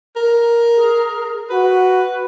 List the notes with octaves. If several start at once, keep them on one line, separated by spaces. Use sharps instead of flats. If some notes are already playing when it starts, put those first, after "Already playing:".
A#4
G#4
F#4 B4